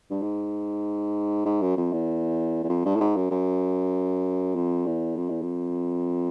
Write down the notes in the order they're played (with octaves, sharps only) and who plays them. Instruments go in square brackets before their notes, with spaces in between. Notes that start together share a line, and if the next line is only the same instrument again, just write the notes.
[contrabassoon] G2
G#2
G#2
F#2
F2
E2
E2
F2
G2
A2
G#2
F#2
F#2
F2
E2
F2
E2
F2